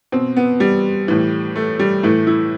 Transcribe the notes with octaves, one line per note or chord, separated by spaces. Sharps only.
B2 C4
B3
G3
A2 E3
A3
G3
A2 E3 A3
E4